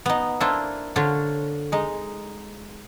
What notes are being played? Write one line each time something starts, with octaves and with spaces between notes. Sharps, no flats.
B3 D#4
A#3 D4 E4 F4 A4 C5
D3 D4 F4 C5 C#5
G#3 D#4